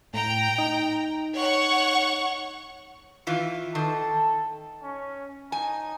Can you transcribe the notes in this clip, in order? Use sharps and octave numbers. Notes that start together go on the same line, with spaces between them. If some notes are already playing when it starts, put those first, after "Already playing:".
A2 G5 A#5
D#4
C#5 F#5 C#6
D#3 E3 F4
D#3 A4
C#4
D#4 G#5